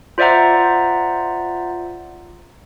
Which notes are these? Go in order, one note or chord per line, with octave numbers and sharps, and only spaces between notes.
F4 C5 D5 E5 F#5 A#5